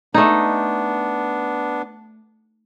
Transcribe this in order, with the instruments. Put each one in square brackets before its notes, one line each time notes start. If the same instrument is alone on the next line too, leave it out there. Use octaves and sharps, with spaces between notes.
[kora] A3 D#4 [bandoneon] B3 D4